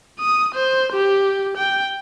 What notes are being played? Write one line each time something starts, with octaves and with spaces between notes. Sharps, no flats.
D#6
C5
G4
G5